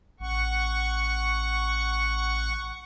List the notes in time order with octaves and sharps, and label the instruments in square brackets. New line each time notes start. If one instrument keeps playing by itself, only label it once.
[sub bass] A1 [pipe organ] F#5 C#6